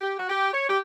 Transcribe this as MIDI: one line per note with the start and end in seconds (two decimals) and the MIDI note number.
0.01 0.14 67
0.18 0.26 66
0.29 0.48 67
0.53 0.67 73
0.67 0.77 67